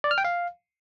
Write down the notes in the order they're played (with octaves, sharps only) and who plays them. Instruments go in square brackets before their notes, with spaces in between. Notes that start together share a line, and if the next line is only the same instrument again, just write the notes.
[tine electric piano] D5
F6
G5
F5